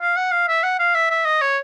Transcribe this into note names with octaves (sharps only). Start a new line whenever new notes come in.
F5
F#5
F5
E5
F#5
F5
E5
E5
D#5
C#5